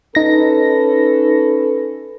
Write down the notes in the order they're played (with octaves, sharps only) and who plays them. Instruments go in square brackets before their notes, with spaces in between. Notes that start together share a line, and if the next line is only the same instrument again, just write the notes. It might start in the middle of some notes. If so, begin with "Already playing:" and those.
[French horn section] C#4 A4 B4 [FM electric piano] D#4 A#6